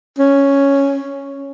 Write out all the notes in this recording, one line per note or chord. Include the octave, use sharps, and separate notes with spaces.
C#4